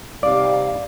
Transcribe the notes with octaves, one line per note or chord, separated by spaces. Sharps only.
C3 G3 D#4 D5 F5